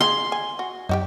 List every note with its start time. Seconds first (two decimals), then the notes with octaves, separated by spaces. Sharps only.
0.01 F3 D#4 G#4 C6
0.32 G#5
0.59 F#4
0.89 F#2 D#4 F#4 G4